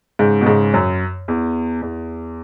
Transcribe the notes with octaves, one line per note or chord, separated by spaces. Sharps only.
G#2 C#3
B2
G#2 C#3
F#2
E2
E2